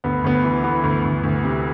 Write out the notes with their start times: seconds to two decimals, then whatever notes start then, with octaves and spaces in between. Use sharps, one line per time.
0.04 D2 B3
0.24 D2 B3
0.44 E3
0.64 E3 B3
0.84 D2
1.04 D2
1.23 D2
1.43 C3